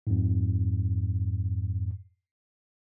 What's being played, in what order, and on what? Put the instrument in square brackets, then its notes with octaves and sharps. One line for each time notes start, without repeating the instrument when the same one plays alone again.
[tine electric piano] F2 G#2